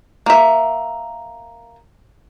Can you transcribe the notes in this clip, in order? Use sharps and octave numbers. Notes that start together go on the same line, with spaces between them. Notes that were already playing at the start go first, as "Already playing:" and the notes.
A#3 E5